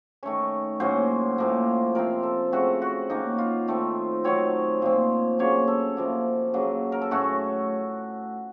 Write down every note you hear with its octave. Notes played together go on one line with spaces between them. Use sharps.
D#3 A3 C#4 C#5
A2 F#3 A#3 C#4 C5
A2 F3 A#3 C#4
C3 F3 C4 A#4
A4
C#3 A3 C4 F#4
F#4
D#3 A#3 C#4 D#4
F4
D#3 A3 C4
D#3 F#3 C4 C#5
A#2 F3 C4
C#3 F#3 A#3 C#4 C#5
A4
C3 F3 A#3
C#3 F#3 A#3
A#4
A4
A2 A3 C#4 F#4